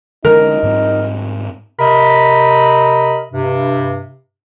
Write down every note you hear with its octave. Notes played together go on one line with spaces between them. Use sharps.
D3 G#3 C#4 D#4 A#4
G#2 G3 C4
C3 A#4 D#5 B5
G2 C3